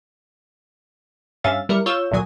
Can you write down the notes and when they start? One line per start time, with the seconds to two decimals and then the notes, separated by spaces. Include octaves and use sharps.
1.44 G2 C#4 E5 F5 A6
1.69 G3 E4 A#4 C#7
1.86 F4 C#5 E6 G6 E7
2.11 G#1 D2 A#2 F#3 G#5 D#6